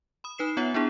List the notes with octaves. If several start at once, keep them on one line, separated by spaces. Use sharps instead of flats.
B5 D#6
D#4 B4 C7 E7
B3 F4 C#5 E5 F#5
B3 D4 E4 G#4